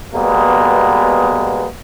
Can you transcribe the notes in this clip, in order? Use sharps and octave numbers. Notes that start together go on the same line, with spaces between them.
B2 G3 G#3 A#3 B3